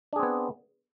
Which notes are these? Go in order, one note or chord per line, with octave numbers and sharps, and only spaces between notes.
B3 C4 D4 G#4